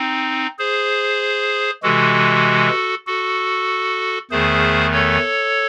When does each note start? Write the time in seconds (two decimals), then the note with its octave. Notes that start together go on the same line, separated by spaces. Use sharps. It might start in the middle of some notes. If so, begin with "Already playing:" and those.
Already playing: C4 D#4
0.59 G#4 C5
1.83 C3 E3 G#3 F#4 A4
3.07 F#4 A4
4.31 E2 D#3 A3 G#4 C5
4.93 A4 C#5